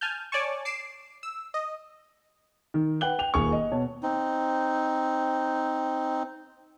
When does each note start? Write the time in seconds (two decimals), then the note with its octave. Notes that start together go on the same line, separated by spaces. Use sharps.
0.01 G#5 A5 F6 G6
0.32 C#5 D5 G#5 A5 C#6
0.65 D6 C7 D7 E7
1.23 E6
1.54 D#5
2.74 D#3
3.01 B4 F#5 G5 F#6 F#7 G7
3.19 G5 F7
3.34 D#1 A#3 G#4 G#5 C#6
3.52 D#5
3.72 B2 C#5 A5
4.03 C4 D#4